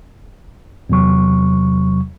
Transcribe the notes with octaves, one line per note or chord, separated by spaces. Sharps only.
E2 C3 F#3 C#6